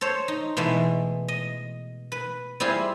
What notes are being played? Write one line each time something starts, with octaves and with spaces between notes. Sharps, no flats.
A4 C5 C#5
D#4
B2 E3 G#3 A3
D#5
B4
G3 C4 E4 F4 G#4